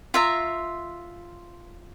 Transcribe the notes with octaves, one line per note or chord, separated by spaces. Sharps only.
F4 E5 A#5